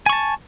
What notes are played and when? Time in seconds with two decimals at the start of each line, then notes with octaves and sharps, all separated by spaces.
0.06 G#5
0.09 C#6
0.13 A5